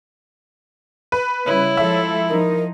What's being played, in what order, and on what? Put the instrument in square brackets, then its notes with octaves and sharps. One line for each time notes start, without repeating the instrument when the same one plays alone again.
[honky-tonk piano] B4
[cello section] C#3 G3 [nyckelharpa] E4 [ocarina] C#5
[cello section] F3 G#3 A4 [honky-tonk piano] E5
[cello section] F3 D#4 [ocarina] A#4